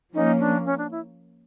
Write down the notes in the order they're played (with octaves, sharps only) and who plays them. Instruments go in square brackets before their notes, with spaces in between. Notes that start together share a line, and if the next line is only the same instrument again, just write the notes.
[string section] F3 A#3 C#4 [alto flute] D#4
[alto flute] D4
C#4
D4
E4